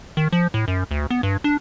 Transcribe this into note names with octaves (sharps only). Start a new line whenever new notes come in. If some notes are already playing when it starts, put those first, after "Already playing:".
D#3
F3
A2
F#2
D2
B3
G2
D4